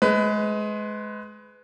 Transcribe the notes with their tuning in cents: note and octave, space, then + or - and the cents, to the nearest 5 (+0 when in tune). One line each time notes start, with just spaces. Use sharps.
G#3 +25 B4 +30